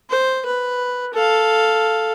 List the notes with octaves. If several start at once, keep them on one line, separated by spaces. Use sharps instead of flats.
C5
B4
A4 F5